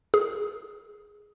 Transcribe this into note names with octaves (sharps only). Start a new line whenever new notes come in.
G#4